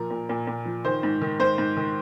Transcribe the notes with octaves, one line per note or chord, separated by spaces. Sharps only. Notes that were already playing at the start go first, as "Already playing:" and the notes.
Already playing: A#2 F3 A#4
A#2
A#2
A#2
F3
D#3 C5
G#2
D#3
G#2 C5
G#2
D#3